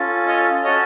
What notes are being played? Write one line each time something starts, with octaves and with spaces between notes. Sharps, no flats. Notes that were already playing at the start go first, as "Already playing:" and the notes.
Already playing: C#4 F4 A4
C#5 D#5
C#4 F#4 A4 C#5 D#5